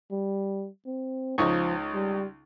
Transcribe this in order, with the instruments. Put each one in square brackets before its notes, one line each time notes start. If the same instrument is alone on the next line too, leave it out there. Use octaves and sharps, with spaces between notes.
[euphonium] G3
C4
[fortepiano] C#2 D#4 C#6 [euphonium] F3
[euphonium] G3